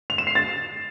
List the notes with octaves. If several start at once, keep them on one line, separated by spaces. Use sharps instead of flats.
F7
E7
C7
A6